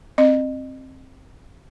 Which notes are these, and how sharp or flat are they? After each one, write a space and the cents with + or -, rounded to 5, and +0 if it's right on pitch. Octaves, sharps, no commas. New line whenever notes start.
C4 +10 D#5 -30